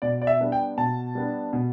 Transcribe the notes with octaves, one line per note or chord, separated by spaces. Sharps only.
B2 D5
D5
E5
G3 B3 D4
G5
B2 A5
G3 B3 D4
B2